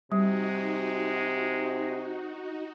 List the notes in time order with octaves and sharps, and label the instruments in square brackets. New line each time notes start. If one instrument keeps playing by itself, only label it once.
[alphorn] C3 [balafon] G3 [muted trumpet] G#3 [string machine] D#4 F#4